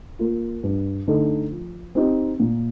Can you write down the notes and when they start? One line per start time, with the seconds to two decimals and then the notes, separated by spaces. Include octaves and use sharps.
0.19 A#3 F4
0.63 G2
1.08 D3 A3 D#4 A4
1.51 F3
1.95 C4 D#4 G4
2.40 A#2